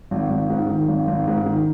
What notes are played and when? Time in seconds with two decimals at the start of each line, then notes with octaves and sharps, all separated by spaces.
0.11 G#1
0.30 G#1
0.50 G#2
0.69 D#3
0.88 G#1
1.08 G#1
1.27 G#2
1.46 D#3